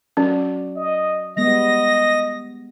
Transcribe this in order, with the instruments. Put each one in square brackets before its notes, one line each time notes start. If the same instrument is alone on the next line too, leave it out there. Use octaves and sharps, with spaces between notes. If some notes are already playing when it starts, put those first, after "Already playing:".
[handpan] F#3 F#4 D5 [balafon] C#4
[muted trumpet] D#5
[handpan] G3 G#3 B3 [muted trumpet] D#5 [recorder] A#6